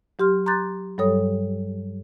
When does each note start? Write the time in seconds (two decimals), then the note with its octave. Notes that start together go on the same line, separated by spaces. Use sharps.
0.19 F#3 G4 C6 F6
0.46 A#5 C6 D6 F#6 G6 A6
0.98 G2 F#3 G3 A4 C#5 D#6